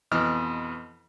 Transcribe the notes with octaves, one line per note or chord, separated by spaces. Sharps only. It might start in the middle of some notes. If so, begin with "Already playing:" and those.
F2 B2 E3 D#5 F6